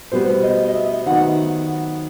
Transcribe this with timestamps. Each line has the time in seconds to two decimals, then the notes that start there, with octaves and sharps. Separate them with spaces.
0.12 B2 G3 B3 C5
0.43 D#5
0.68 D#5
0.75 E5
1.06 D#3 F#3 B3 F#5